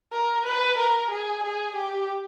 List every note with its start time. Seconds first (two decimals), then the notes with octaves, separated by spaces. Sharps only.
0.12 A#4
0.45 B4
0.78 A#4
1.10 G#4
1.43 G#4
1.76 G4